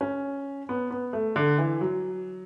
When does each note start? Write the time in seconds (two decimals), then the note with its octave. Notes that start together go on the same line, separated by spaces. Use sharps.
0.01 C#4
0.69 B3
0.91 B3
1.13 A3
1.36 D3
1.58 E3
1.81 F#3